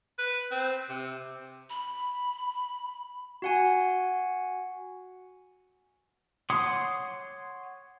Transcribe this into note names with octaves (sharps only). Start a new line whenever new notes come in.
B4
C4
C3
B5
F#4 F#5 G#5
C#5 F#5 C6 D6 D#6